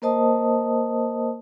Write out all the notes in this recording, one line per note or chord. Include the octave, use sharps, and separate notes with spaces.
A#3 A#4 C5 D#5 A5 D#6